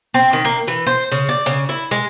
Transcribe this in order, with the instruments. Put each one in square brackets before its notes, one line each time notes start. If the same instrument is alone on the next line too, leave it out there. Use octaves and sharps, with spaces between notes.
[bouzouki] C4
D#3
A#3
E3
C5
C#3
D5
C#3
E4
G#3